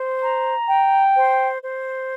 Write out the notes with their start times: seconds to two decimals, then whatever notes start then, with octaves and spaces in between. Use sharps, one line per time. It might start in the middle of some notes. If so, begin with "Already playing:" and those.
Already playing: C5
0.22 A#5
0.69 G5
1.16 C5
1.63 C5